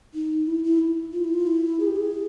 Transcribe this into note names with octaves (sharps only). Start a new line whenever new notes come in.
D#4
E4
E4
F4
E4
F4
E4
G#4
G4
G#4